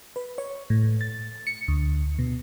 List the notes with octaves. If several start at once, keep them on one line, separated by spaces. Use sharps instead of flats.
B4
C#5
A2
A6
C#7
D2
B2